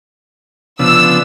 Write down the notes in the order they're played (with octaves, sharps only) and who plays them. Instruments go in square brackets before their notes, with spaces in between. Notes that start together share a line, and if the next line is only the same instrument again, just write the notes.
[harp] C#3 [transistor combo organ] F3 B3 D4 [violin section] E6